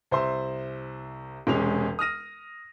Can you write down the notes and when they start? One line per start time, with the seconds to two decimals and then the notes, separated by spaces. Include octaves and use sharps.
0.11 C2 C5 E5 C6
1.47 E1 C3 G#3 C#4 F7
1.99 D#6 F6 A#6 D#7